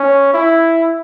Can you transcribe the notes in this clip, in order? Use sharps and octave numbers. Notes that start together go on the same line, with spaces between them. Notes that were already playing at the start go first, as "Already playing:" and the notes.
Already playing: C#4
E4